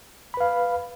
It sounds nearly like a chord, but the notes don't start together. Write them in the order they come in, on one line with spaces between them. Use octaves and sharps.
B5 B4 F5